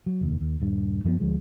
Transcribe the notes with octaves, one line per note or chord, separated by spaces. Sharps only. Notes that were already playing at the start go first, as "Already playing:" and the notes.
F#3
F1 D#2
D#2
D#1 G2
F#2 F3 A#3 B3
D2 F3 G#3